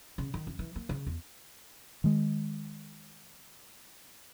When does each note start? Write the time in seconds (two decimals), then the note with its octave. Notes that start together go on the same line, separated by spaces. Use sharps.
0.18 C#3
0.34 D#3
0.47 F#2
0.59 E3
0.76 A#3
0.89 C#3
1.07 E2
2.04 D#3 G#3